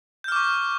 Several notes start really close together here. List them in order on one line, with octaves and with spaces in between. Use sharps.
G6 F6 D6 C#6